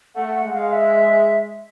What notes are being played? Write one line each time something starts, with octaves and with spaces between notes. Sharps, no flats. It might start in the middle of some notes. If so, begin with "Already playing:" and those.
A3 F#5
F#5
G#3
F5
E5